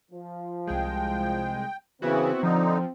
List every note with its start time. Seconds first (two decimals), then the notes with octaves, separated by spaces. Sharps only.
0.11 F3
0.67 C2 G#3 G5
2.02 C#3 E3 B3 C4 E4 F#4
2.43 D3 F3 D#4